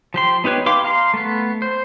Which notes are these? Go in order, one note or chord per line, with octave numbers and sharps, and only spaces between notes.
F3 G4 C6
B3 D#4 G4 B4 C#5
G4 B4 F5 C6 D6
F5 A#5 C6
A3 B3
C5